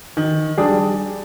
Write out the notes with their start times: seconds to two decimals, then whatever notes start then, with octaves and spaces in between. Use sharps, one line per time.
0.17 D#3
0.58 G3 D4 G#4